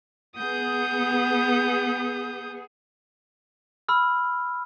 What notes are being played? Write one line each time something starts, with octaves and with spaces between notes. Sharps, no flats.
B3 G#4 D#6 G6
B5 E6 F6